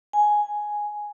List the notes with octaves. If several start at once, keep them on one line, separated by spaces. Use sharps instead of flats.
G#5